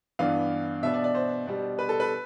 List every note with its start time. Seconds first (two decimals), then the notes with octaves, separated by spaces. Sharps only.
0.19 G2 E3 B3 D4 F5
0.83 B2 B3 D4 E5
0.94 D5
1.04 D5
1.15 C5
1.47 B2 G3 D4
1.79 B4
1.89 A4
2.00 B4